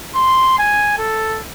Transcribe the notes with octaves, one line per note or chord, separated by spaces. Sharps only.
C6
G#5
A4